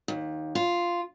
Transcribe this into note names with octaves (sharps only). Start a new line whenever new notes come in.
D#2
F4